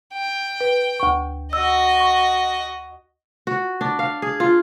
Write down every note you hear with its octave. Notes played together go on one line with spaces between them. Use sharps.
G5
B4
D2 C#6
F#4 D#5 E6
C#6
F#4
D4
F5
G#4
F4